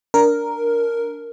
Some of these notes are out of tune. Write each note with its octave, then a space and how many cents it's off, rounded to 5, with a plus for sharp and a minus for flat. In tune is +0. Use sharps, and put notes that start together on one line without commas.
D4 -15 A#4 +0